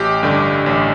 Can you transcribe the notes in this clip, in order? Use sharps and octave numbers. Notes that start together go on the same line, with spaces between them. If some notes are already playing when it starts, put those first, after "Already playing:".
Already playing: A1 G4
G2 D3
A1